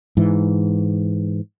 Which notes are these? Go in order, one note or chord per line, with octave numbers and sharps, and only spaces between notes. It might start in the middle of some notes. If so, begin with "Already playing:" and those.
G#2 E3